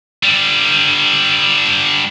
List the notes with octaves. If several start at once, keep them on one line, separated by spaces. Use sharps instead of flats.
D3 G3